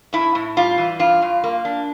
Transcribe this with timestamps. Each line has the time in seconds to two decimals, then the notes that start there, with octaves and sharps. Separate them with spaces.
0.13 A2 E4
0.35 A2
0.57 G3 F4
0.78 E3
0.99 G2 F4
1.22 G2
1.44 A#3
1.65 D4